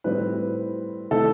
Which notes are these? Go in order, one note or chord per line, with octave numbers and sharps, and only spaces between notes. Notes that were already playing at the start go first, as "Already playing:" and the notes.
A2 G3 C4 B4
C3 E3 A3 A4